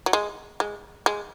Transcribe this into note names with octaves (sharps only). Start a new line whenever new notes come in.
F#3
G#3
G#3
G#3